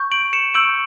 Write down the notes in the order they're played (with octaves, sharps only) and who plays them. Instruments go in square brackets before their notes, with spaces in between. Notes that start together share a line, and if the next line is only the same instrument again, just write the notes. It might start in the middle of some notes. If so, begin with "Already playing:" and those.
Already playing: [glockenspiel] C#6 G6
D7 F#7
C#7 E7
C#6 E6 G6 D7 F#7